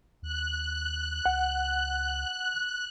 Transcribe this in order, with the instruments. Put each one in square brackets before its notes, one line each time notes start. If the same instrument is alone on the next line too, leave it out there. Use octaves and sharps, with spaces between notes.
[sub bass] D#2 [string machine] F#6
[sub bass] C#2 [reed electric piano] F#5